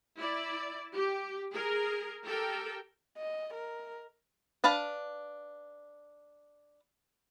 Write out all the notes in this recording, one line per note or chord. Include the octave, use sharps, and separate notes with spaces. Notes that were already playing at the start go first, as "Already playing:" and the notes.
E4 D5
G4
G#4 A#4
G4 A4 A#4 G5
D#5
A#4
D4 B4 F5 A5